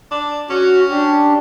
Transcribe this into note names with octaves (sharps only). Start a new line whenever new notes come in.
D4
C#4 F#4
D4 G4